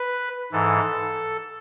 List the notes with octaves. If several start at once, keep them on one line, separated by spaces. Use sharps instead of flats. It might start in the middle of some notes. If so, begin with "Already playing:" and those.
Already playing: B4
G#2 E3 A4